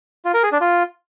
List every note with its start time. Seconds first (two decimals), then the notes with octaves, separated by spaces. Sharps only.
0.25 F4
0.34 A#4
0.43 G#4
0.52 D4
0.61 F4